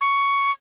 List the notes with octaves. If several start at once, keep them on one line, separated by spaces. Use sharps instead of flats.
C#6